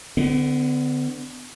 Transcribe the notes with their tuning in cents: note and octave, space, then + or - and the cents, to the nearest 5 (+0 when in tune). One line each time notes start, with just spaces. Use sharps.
D3 +0 B3 +40